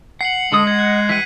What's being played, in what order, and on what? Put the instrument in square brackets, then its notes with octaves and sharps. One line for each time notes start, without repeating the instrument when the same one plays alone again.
[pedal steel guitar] F#5 [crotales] C7 C#7 F#7
[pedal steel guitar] D3 A4 D#6 [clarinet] G#3
[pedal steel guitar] D#5 F#5 [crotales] G#6
[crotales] F#6
[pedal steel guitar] E3 G3 F#5 [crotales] B6 D#7